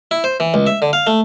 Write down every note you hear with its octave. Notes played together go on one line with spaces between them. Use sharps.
E4
C5
E3
C#2
E5
D3
F5
A3